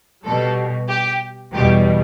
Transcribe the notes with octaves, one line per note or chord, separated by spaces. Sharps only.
B2 G3 A4
G4
E2 B2 G3 G4